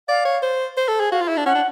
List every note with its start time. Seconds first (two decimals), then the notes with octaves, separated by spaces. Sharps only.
0.08 D5 F5
0.25 C#5
0.42 C5
0.77 C5
0.88 A4
1.00 G#4
1.11 F#4 F5
1.21 F4
1.28 E4
1.37 D4
1.46 C#4 F#5
1.55 D4